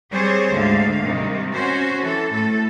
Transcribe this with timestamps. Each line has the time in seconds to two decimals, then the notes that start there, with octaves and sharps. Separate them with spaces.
0.11 G3 C4 G#4 C5 C#5
0.52 D2 G#2 D3 F5
1.03 C3 D#3 G3
1.53 C#4 F#4 C5
2.00 E3 A4
2.32 A2 A4